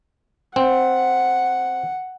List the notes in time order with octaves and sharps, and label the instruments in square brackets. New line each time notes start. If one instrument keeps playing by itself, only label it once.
[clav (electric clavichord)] C4 [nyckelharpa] F#5